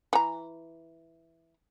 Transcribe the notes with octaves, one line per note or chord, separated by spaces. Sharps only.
E3 A#5